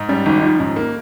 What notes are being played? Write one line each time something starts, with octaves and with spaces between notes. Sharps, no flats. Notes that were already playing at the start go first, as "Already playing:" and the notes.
Already playing: G#2
G3 C#4
G#1 D#4
F3 D#4
G#2 C#4
A#3